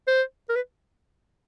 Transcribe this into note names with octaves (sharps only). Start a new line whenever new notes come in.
C5
A#4
B4